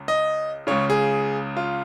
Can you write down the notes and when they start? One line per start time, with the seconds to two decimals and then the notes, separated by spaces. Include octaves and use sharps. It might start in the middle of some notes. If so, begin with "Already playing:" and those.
Already playing: C#2 C#3
0.08 D#5
0.67 C#2 C#3 C#5
0.90 G#4
1.57 F4